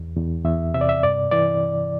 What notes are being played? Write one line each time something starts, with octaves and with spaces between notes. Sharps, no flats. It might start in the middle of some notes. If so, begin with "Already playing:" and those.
Already playing: E2
E2
E2 E5
C3 E5
D5
E5
G2 D5
E3 D5